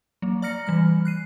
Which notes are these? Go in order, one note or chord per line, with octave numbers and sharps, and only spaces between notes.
F#3 A#3
D5 A#5 F6 A#6 C#7
E3 G3 F6
F#6 C7 D#7